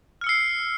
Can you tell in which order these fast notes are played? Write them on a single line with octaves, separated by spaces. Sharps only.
F6 C#7 E6 C7